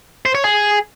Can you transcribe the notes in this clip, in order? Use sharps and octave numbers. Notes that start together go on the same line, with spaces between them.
C5
C#5
G#4